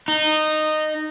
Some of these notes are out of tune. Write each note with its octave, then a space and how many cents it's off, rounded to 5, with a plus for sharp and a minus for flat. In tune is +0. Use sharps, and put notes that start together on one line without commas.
D#4 -15